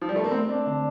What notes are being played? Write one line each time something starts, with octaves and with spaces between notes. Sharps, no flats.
F3
G3
A3
A#3
A3 C4
C4 D4
D3 D4